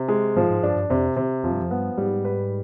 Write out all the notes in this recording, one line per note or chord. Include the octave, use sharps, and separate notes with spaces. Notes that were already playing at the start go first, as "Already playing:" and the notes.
Already playing: C3
G#3
G#2 F3
G#2
G2 D4
G2
F2 C3
C3
F2 F3
G2
F2
G2 B3
G#2 G3
B4